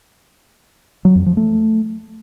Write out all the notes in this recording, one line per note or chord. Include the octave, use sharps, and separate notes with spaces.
F#3
F2
F3
A3